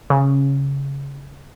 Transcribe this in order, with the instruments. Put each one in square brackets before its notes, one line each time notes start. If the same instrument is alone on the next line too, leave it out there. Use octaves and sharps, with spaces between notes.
[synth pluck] C#3